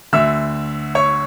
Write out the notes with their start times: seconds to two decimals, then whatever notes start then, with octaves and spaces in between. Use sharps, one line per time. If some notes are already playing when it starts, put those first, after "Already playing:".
0.13 D2 D3 E5 E6
0.95 C#5 C#6